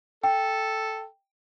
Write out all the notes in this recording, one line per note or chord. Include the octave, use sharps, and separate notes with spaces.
A4 G5